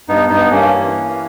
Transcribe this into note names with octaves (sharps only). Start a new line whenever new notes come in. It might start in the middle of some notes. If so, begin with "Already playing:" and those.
G2 B3 D#4
G2 B3 D#4
G2 A#3 C#4
E3
E3